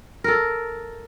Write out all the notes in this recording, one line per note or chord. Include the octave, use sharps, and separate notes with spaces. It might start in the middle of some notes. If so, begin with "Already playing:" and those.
A4 A#4